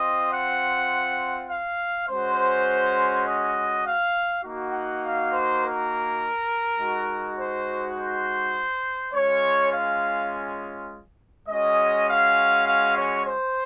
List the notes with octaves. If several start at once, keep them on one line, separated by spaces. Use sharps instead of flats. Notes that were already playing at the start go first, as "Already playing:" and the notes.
Already playing: C4 F4 D#5
F#5
F5
G#3 C#4 F#4 C5
D#5
F5
A#3 D#4 F#4
F#5
F5
C5
A#4
G#3 D#4 F#4
C5
C5
G#3 C#4 F4 C#5
F5
G#3 C#4 F#4 D#5
F5
F5
C#5
C5